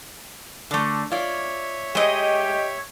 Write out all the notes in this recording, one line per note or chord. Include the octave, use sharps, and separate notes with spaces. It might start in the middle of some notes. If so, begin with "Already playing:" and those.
D3 A3 D4
F4 C#5 D5 E5
G#3 A3 G4 D#5